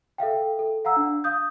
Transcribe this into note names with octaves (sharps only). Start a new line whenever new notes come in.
A4 E5 F5 G5
A4
F5 F#5 A#5 E6
D4
F5 D#6 G6